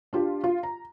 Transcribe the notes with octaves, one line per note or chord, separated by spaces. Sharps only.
D4 F4 G4
F4
A#5